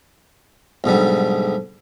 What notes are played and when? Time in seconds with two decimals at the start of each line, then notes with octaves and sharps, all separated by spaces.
0.84 B1 G#2 D3 G3